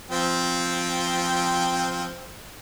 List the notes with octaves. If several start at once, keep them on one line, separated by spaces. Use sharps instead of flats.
F3 C4 G5